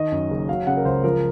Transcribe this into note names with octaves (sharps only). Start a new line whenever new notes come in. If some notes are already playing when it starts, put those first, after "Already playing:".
Already playing: D#3 D#5
F#2
F#1
F#3 F5
C#3 F#5
A#4
C#2 C5
F3 A#4